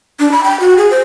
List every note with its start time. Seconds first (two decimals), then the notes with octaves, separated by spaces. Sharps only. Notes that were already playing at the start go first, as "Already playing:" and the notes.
0.20 D4
0.32 B5
0.44 G5
0.60 F#4
0.78 G#4
0.91 C5